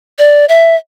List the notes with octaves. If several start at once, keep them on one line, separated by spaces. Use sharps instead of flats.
D5
E5